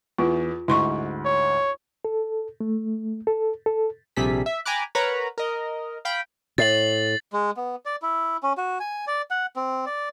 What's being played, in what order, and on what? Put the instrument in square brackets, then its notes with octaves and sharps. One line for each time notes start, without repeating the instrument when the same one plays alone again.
[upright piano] E2 [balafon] F4
[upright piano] D2 G#2 [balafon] E4 C6 C#6
[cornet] C#5
[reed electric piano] A4
A3
A4
A4
[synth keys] A#1 C3 G3 G#4 A4 B6
E5
G5 G#5 A#5 B5 D6 F#6
A#4 B4 C#5 F#5 A#5 B5
A#4 D#5
F5 G5 B5
[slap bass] A2 [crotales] A6 C7 F#7
[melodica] G#3
B3
D5
E4
C#4
F#4
G#5
D5
F#5
C4
D5